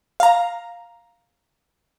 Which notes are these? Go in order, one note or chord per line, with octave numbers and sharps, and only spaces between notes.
F5 A#5